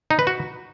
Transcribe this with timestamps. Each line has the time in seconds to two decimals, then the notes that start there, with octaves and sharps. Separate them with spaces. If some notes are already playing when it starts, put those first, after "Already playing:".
0.11 D#4
0.19 B4
0.27 F#4